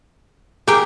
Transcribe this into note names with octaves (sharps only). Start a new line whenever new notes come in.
G4 G#4 A#4 G5